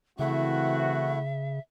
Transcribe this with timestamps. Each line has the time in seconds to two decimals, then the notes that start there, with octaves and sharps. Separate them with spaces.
0.19 C#3 E3 A3 C4 E4 F#4 E5 F#5